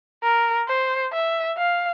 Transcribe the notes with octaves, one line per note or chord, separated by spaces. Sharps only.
A#4
C5
E5
F5